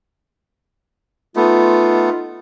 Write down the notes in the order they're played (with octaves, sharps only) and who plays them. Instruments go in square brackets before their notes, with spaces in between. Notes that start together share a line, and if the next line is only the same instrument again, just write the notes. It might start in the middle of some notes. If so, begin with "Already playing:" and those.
[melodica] A3 B3 [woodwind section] D#4 F4